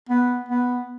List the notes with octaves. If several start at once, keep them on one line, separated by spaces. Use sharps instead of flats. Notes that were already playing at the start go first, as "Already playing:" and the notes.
B3
B3